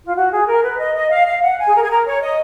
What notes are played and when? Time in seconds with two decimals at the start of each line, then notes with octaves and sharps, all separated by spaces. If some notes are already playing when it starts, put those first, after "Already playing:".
0.05 F4
0.15 F#4
0.31 G#4
0.47 A#4
0.63 B4
0.78 D#5
0.94 D#5
1.10 F5
1.27 F5
1.42 F#5
1.58 G#5
1.67 G#4
1.74 A#4
1.82 G#4
1.90 A#4
2.06 C#5
2.21 D#5